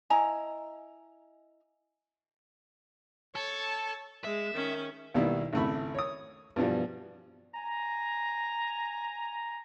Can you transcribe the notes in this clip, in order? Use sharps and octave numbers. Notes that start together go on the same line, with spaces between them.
E4 D#5 G#5 A#5
A4 C#5 A5
G#3 E5
D#3 C#4
B1 D#3 G3 A#3 B3 E4
G#1 C#2 A3 E4 B5
C#5 D#6
G2 B2 E3 F3 G3
G#5 A#5